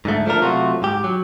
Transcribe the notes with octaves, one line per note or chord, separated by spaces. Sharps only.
G#2 D3 A3
F3 A3 D4 A#4
C3 F#3 A3 F4 F#4
G#2 G4
F#3